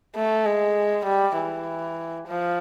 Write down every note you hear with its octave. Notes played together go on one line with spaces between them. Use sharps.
A3
G#3
G3
E3
F3